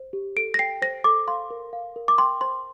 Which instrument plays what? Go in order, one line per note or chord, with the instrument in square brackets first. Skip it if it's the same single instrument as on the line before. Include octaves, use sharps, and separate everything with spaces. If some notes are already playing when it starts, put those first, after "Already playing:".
Already playing: [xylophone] C5
G4
A4 D7
A#6
G5 C7
C5 A#6
A4 D6
F5 C6
A#4
F5
A#4
D6
G5 C6
C5 C6